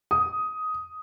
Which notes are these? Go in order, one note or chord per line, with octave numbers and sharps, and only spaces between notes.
D#6